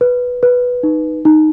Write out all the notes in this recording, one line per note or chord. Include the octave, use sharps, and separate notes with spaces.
B4
B4
D#4
D#4